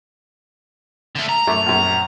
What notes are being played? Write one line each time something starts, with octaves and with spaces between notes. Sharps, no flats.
D3 A3
A#5
F#2 A3 D6
A#1 F#2